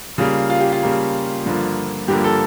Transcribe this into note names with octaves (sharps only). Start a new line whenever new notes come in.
C#3 G3 A#3 F4
F4
G4
F4
C#3 G3 A#3
G2 D3 F3 A#3
G2 D3 F3 A#3 G4
A4